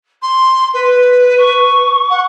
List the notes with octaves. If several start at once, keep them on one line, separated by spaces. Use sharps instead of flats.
C6
B4
C#6
F#5